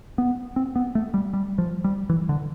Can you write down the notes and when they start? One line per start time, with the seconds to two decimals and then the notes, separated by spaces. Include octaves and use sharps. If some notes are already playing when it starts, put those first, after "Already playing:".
0.18 B3
0.56 C4
0.76 B3
0.95 A3
1.14 G3
1.33 G3
1.58 F3
1.84 G3
2.09 E3
2.29 D3